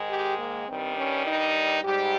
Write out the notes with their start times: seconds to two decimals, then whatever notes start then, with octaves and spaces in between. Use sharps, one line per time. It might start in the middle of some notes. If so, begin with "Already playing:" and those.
Already playing: G#2 D#3 G#3
0.10 G4
0.39 A#3
0.68 G2 D#3 G3 C4
0.97 C#4
1.27 D#4
1.83 G#2 G3 G4